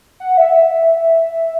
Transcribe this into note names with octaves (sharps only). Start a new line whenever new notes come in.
F#5
E5
E5